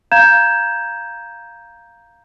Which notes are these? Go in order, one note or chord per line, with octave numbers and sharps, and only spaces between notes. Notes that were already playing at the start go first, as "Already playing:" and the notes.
F5 A#5 G6 G#6 E7